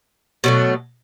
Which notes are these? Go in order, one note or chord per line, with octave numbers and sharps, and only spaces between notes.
B2 F#3 A3